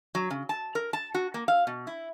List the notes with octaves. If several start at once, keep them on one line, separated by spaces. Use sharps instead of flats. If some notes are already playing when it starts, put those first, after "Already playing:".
F#3
C#3
A5
A#4
A5
F#4
A#3
F5
B2
E4